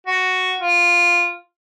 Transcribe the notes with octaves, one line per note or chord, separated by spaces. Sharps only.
F#4
F4